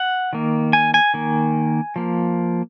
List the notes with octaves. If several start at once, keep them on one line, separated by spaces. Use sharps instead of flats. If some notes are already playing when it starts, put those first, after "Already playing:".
Already playing: F#5
D#3 A#3
G#5
G#5
D#3 A#3
F3 A#3